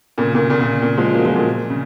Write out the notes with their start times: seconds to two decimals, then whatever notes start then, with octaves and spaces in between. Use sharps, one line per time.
0.18 A#2 C#3
0.34 A#2 C#3
0.50 A#2 C#3
0.61 A#2 C#3
0.82 A#2 C#3
0.98 F3 G#3
1.14 F#3 A#3
1.25 F3 G#3
1.35 A#2
1.70 C#3